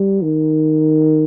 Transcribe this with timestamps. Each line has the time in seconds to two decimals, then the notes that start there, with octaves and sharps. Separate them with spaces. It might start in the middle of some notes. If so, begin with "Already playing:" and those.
Already playing: G3
0.22 D#3